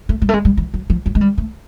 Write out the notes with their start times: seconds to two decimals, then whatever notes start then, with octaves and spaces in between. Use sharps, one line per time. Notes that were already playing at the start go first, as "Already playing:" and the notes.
0.09 A3
0.22 G3
0.29 A3
0.34 G#3
0.45 G3
0.57 E3
0.74 F#3
0.90 F3
1.06 F#3
1.15 G#3
1.21 G3
1.38 A3